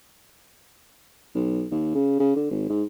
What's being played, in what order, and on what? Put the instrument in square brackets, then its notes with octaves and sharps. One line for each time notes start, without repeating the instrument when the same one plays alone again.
[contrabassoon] B1
D#2
C#3
C#3
D3
G#1
G#2